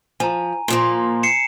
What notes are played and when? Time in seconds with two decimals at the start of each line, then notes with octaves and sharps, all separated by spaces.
0.20 F3 G#5 A#5
0.68 A#2 F3 A#3
1.23 C7 C#7 E7